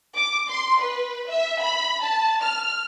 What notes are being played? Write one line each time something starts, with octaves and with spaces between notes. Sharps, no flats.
D6
C6
B4
E5
B5
A5
F6